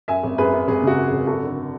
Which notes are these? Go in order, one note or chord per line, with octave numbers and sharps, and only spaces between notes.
F#2 E5 G#5
G#1
F#2 G#4 B4
F#2
G#1 G#4
C#3 F#4
F#2
G#4
G#1
F#2 F#4 A4
D3